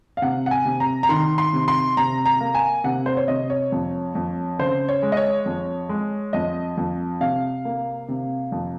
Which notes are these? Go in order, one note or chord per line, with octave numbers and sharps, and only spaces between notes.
F5
C3 F#5
F#5
G#5
C3
A#5
A#5
D#3 C6
C6
C3
C6
C3 A#5
A#5
A#3
G#5
C3 F#5
C5
C#5
C3 D#5
C#5
F2
F2
C#3 C5
C#5
G#3
D#5
C#5
F2
G#3
F2 D#5
F2
C3 F5
A#3
C3
F2